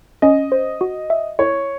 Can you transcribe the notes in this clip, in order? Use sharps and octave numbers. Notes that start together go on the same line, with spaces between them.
C#4 D#5
C5
F#4
E5
E4 C#5